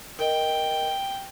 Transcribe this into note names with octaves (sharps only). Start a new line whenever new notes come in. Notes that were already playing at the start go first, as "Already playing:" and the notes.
A#4 D#5 G5